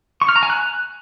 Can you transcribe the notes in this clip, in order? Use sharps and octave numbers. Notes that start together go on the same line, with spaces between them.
C#6
F6
A#5
G#5
F#6